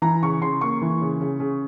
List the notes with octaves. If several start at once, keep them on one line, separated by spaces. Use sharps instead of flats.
E3 A#5
C#3 C#6
C#3 C6
A#3 C#6
E3
C#3
C#3
C#3